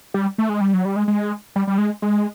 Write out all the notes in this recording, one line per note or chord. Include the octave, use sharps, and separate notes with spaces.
G3
A3
G#3
G3
F#3
G3
G#3
G#3
G3
G3
G#3
G#3